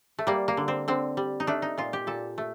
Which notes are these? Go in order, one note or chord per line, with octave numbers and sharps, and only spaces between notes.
A3
G3 A#3
A#3
D3
C4
D3 C4
G3
D#4
A3 D4
D#4
A#2 F4
G4
A#2 A4
A3